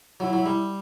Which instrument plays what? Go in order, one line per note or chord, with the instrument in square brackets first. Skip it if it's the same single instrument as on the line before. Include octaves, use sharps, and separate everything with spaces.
[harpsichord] F#3 [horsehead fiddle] E4
[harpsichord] F#3
G3